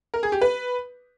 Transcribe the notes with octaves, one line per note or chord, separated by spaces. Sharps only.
A#4
G#4
G4
B4